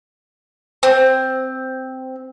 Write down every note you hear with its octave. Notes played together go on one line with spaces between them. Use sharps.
C4